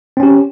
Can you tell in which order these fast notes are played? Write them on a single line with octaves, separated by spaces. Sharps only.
C4 C#4 G4